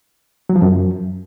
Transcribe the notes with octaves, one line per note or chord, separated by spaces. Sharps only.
F#3
F3
F#2